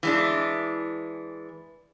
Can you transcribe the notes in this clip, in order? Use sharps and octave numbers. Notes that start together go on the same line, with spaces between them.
E3 G#3 D4